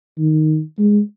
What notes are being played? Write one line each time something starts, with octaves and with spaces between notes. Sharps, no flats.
D#3
G#3